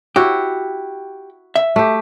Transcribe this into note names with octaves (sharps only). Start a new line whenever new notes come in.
E4 F#4 G4
E5
A3 G4